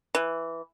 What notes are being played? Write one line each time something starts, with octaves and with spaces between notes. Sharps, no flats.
E3